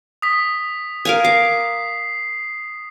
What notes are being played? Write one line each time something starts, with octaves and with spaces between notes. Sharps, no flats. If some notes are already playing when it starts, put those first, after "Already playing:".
D#6 B6
A#4 F5 G#5
D6 C7